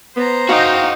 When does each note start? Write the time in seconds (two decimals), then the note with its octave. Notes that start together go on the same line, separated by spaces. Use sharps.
0.17 B3 C5 A#5
0.49 D#4 F#4 F5 G5